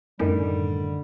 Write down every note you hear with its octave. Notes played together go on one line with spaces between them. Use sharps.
F#2 A2 D3 D#3 G3